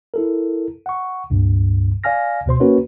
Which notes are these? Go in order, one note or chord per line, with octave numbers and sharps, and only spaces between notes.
E4 A4 A#4
F#5 C#6
C#2 G2 A#2
D5 F5 G#5 F6 A#6
D2 B2 C5 C6
A#3 C#4 F#4 A#4 B4 C#5